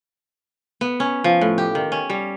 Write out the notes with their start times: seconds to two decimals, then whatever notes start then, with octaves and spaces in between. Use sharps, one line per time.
0.81 B3
1.00 C#4
1.24 F3
1.41 A2
1.58 G4
1.75 D#3
1.92 C#4
2.10 G3